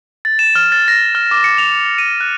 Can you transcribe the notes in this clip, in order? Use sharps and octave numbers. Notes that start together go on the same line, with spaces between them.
A6
E7
F6
A6
A#6
F6
D6
C#7
F7
D#7
F#6